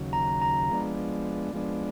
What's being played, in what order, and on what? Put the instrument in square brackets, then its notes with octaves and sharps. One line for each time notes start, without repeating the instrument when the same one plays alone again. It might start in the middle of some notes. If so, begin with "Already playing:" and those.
Already playing: [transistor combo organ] D#2 C#3 F#3
[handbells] A#5
A#5
[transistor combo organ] F3 G#3 B3 D4
F3 G#3 B3 D4